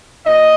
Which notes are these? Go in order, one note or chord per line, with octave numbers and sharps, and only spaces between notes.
A#2 D#5